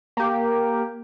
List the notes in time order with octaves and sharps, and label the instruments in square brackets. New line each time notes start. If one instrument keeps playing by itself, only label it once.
[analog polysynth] A#3 G4